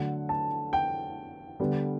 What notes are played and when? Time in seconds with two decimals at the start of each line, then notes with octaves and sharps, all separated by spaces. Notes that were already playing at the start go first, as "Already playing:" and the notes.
Already playing: D3 F#3 A3 F#5
0.29 A5
0.73 G5
1.60 D3 G3 B3